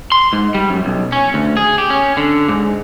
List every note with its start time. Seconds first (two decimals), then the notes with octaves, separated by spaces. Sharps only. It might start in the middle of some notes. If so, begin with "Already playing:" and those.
0.12 C6
0.33 G#2
0.54 G3
0.70 F#2
0.85 B1
1.12 C#4
1.34 D2
1.57 G#4
1.78 G4
1.90 C#4
2.17 D3
2.49 G#2